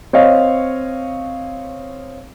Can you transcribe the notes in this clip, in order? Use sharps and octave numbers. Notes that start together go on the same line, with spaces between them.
C4 C#5 D#5 F5